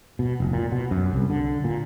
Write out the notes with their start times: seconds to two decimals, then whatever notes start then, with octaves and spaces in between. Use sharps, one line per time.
0.19 B2
0.40 F1
0.53 A#2
0.72 B2
0.91 F#2
1.13 C2
1.30 D3
1.64 A#2